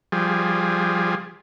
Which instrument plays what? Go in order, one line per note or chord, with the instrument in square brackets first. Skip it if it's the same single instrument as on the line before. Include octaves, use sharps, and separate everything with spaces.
[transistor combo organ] F3 G3 G#4